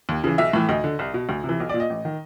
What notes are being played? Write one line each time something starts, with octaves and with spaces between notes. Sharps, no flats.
D#2
C#3 E3
B1 E5
A2 E3
D2 D#5
D3
C2
B2
D2
C3 E3
B1
A#2 D5
D#5
A1
D#3